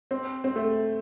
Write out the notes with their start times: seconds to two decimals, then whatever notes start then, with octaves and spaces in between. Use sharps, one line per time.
0.11 C4
0.44 C4
0.56 A3